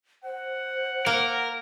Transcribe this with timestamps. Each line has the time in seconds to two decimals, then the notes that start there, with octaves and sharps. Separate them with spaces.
0.24 C5 F#5
1.06 A#3 A#4